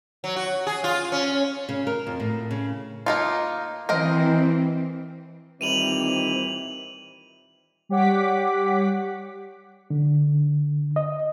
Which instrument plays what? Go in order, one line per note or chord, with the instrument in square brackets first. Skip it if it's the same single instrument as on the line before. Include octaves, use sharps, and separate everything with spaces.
[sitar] F#3
F#4
G#4
F4
C#4
[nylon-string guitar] C#3
A#4
F2
A2
C#3
[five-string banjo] A#3 D#4 F4
[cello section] E3 C4 [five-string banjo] A#4 C5 D#5
[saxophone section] A#2 E3 G3 [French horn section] D#3 C4 [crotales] D#7 F7 F#7
[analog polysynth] G3 G4 C#5 F#5 D6 B6
[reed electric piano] D3
D#5